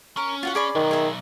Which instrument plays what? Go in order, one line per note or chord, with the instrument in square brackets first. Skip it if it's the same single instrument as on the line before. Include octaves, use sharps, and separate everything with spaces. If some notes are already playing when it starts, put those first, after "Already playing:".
[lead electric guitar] C#4 [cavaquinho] A#4
[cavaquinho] F4 F#4 F#5
G#4 D5 B5
[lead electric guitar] B1 F#2 [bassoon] D#3
[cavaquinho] G#4 E5